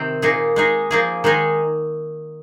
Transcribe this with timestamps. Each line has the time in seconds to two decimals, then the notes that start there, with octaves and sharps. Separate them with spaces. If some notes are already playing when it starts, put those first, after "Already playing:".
Already playing: C3 D#3 C4
0.22 A#2 A#3 D#4 G#4
0.56 G#3 D#4 G#4
0.91 F3 A#3 G#4
1.24 D#3 G#3 D#4 G#4